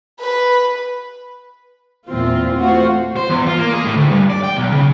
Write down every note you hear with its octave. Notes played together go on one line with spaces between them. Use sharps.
B4
E2 A#2 E3 C4 F4
A3 F4 F#4 C5
C5
E2
F4
A#3
G#4
A2
D2
G2
D5
G5
B1
C#3